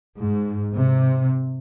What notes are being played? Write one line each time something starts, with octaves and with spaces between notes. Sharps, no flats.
G#2
C3